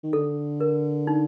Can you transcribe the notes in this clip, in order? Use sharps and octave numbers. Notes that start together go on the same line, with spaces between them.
D#3
D3 A4
A#4
D#4